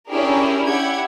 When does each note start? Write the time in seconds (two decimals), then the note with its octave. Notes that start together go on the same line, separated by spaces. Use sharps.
0.11 C#4 D4 E4 G4 G#4 A#4
0.68 E4 G4 F#5 G#6